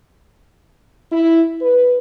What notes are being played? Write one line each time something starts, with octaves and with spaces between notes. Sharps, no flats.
E4
B4